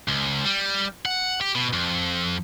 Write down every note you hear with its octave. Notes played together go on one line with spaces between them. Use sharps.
C#2
G3
F#5
G4
B2
F2